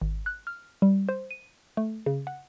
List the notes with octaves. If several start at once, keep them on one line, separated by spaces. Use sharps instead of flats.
G#1
F#6
F6
G3
C5
D#7
A3
C#3
F#5